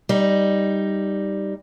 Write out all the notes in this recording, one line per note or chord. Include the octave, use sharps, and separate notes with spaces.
G3 D#4